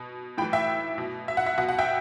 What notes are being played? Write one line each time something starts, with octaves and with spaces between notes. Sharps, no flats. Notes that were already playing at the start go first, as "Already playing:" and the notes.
Already playing: B2
A2 E3 G5 B5
E5 G5
B2
E5
F#5
E5
B2 F#5
F#5
E5 G5